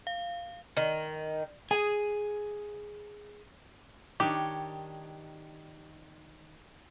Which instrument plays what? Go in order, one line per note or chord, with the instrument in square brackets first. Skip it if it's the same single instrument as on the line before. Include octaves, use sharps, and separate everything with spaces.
[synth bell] F5
[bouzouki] D#3
[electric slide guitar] G#4 G#5
[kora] D#3 D4 C#5 [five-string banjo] G4